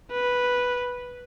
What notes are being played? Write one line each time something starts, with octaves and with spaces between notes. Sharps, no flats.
B4